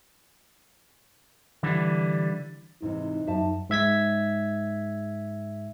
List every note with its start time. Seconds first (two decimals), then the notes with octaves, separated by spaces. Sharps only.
1.63 D3 E3 G3
2.82 G#2 C3 E3 D#4
3.27 F#2 E5 A5
3.70 G#2 E5 G#6 B6